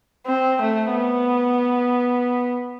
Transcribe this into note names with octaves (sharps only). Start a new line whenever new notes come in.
C4
A3
B3